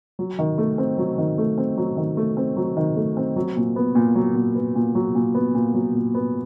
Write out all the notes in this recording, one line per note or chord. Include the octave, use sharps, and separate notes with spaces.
F#3
D#3
A3
C4
F#3
D#3
A3
C4
F#3
D#3
A3
C4
F#3
D#3
A3
C4
F#3
A#2
B3
A#2
F#3
A#2
B3
A#2
F#3
A#2
B3
A#2
F#3
A#2
B3